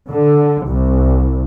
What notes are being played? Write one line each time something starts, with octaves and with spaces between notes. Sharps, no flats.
D3
C2